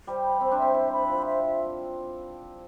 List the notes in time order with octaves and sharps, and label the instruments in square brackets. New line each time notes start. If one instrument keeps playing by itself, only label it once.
[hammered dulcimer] G3 [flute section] C5
[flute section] B5
[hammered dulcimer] C4 [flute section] C5
[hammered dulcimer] D4
[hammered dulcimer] C4 [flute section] E5
[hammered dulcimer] E4 [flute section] C5
[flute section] B5
[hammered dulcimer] F4 [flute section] C5
[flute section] E5